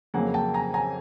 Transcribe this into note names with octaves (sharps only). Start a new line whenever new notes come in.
F2 C#3 F#3 A#3 F#5 G#5
G5 A5
G#5 A#5
G#5 A#5